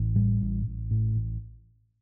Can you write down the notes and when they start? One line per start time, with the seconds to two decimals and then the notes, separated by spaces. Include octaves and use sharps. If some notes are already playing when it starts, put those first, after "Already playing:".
Already playing: A1
0.16 A2 G3
0.42 A1
0.66 A1
0.91 A2
1.15 A1